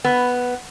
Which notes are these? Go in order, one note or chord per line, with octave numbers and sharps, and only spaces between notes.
B3